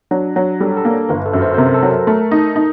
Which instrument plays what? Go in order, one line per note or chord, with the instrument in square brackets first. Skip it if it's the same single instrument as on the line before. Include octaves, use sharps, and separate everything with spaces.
[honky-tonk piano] F#3 [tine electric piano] D4
[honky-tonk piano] F#3
[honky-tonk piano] G3 [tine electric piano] A4
[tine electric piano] A4
[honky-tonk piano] A#3
[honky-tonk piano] G1 [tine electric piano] A#4
[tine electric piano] A4
[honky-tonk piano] F#2
[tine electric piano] C5
C5
[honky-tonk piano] C3 [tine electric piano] A#4
[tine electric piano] A4
[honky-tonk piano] F#3
[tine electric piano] A#4
[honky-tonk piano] A3 [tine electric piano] A#4
[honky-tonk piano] D#4
D#4